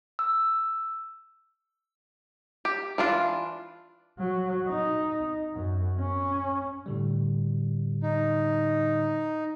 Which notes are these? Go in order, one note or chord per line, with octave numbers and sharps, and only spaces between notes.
E6
G4
E3 D4 F4
F#3
D#4
F#2
C#4
A2 D3 G3
D#4